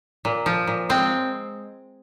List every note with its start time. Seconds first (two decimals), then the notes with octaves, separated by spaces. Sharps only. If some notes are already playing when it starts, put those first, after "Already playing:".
0.25 A#2
0.46 F3
0.67 A#2
0.89 G#3 C4